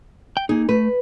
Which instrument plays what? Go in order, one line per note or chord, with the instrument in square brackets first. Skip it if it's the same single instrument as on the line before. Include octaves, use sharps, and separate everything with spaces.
[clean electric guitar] G5
[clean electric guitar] A#3 D#4 [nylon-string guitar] G#4
[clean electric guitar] A3 [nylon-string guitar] B4